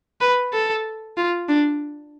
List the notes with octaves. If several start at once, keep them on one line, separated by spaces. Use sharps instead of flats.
B4
A4
F4
D4